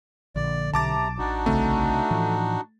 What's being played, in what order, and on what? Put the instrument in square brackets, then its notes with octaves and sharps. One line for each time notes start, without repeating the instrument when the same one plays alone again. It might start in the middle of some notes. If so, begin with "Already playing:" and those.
[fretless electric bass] A#1 [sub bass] D3 [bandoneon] D5
[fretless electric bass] B1 [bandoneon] C3 A#5 [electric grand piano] A5 D6 A6
[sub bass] A1 [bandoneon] D4 D#4 F#4
[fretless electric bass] C2 C#3 C4 [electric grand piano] A3
[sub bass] A2 [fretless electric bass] E3 F3